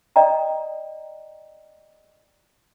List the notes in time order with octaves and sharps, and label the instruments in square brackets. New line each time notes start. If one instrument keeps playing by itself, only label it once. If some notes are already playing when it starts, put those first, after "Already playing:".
[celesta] D5 D#5 G5 A#5